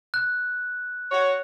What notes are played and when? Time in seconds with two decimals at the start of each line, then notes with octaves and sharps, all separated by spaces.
0.14 F#6
1.12 F#4 C#5